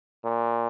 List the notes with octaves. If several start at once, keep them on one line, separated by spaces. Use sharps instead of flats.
A#2